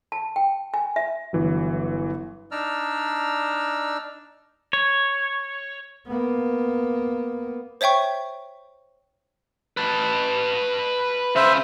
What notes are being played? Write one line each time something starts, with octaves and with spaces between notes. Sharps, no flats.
A5
G5
G#5
E5
G1 E3 F#3
D4 D#4 D5 A#5 E6 F6
C#5
A#3 B3
C5 C#5 E5 G5 C#6
B4 A5
C#3 B4 C5 E5